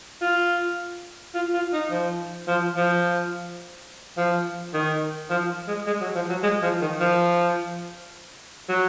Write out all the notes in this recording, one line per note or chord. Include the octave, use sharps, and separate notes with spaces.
F4
F4
F4
D#4
F3
F3
F3
F3
D#3
F3
G#3
G#3
F#3
F3
F#3
G#3
F3
D#3
F3
F#3